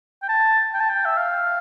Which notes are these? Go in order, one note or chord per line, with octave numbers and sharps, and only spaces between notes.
G5
A5
G5
A5
G5
E5
F5